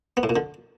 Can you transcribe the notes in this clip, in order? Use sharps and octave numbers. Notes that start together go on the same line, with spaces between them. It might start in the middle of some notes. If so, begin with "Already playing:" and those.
B3
A2
A#2
D3